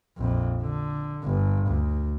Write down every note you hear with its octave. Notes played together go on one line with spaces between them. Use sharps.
A#1 F2
D3
G1
D2